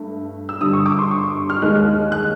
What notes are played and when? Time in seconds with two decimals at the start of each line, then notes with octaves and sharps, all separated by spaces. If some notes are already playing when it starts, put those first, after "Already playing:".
Already playing: G2 A3
0.49 E6
0.61 G2 D3 G3 D#6
0.73 C#6
0.86 D6
0.98 C6
1.11 C#6
1.50 F6
1.62 D#2 D#3 G#3 F#6
2.12 F#6